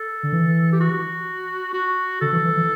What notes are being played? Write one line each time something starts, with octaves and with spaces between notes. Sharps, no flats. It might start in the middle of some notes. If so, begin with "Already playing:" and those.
Already playing: A4
D3
E3
G4
F#4
F#4
D3 A4
E3
E3
E3